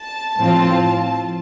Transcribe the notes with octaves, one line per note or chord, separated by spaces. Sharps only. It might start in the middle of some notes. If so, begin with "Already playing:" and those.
Already playing: A5
A2 F3 C4 F4